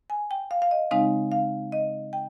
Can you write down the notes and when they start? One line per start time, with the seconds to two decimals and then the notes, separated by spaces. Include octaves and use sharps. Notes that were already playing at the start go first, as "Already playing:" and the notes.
0.10 G#5
0.31 G5
0.51 F5
0.62 F5
0.71 D#5
0.91 C#3 G#3 C4 D#4 F5
1.32 F5
1.72 D#5
2.13 G5